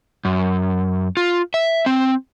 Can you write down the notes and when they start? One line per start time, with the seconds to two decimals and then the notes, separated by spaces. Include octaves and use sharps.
0.25 F#2
1.17 F4
1.54 E5
1.86 C4